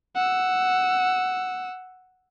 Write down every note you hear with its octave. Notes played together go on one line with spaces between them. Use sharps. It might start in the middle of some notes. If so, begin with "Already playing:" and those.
F#5 E6